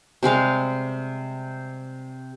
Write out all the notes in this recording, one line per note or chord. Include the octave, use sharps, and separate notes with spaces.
C3 G3 G#3 F5